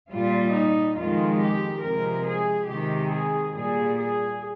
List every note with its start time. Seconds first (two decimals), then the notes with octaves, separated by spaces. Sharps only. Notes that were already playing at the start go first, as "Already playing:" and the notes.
0.11 A#2 G3 F4
0.54 D#4
0.97 F2 D#3 G#3 F4
1.39 G4
1.82 C3 F3 G#3 A#4
2.25 G#4
2.68 C3 D#3 G#3 G4
3.11 G#4
3.53 A#2 G3 G#4
3.97 G#4